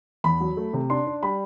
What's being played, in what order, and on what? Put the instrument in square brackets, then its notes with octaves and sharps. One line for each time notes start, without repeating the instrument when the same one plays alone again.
[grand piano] E2 B5
F#3
A3
C3
D4 C6
D4
G3 B5